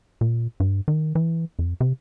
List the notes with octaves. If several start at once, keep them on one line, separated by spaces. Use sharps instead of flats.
A#2
G2
D#3
E3
F2
C3